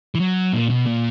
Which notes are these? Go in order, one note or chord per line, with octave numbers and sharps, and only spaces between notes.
E3
F#3
A#2
B2
A#2